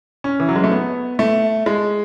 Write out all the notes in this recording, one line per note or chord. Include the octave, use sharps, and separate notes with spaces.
C#4
E3
F#3
G#3
A3
B3
A3
G#3